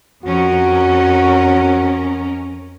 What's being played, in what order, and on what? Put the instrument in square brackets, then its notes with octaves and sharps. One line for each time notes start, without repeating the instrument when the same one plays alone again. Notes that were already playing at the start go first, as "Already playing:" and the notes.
[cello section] F2 C#4 A#4 [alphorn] F#4